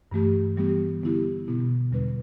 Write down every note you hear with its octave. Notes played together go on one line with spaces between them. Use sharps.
G2 E3 A3 G4
E3 G3 B3 G4
D3 B3 E4 G4
B2 B3 E4
E2 D3 G3 D4 B4